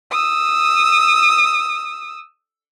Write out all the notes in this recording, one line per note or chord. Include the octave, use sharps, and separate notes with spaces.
D#6 E6